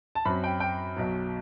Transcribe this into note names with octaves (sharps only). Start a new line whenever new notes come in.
A5
F#2 F#3 C4 B5
G5
G5
B1 B2 F#3